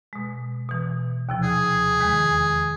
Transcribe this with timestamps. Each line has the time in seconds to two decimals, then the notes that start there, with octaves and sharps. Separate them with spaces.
0.13 B2 G#3
0.69 B2 E3
1.29 D#2 C3 F3
1.43 G#4
2.00 E2 D#3 G#3